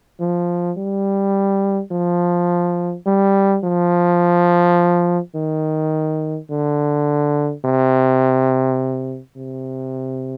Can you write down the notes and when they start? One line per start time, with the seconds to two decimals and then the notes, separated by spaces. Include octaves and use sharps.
0.20 F3
0.78 G3
1.92 F3
3.06 G3
3.64 F3
5.36 D#3
6.50 D3
7.65 C3
9.37 C3